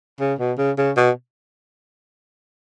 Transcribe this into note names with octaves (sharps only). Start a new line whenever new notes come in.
C#3
B2
C#3
C#3
B2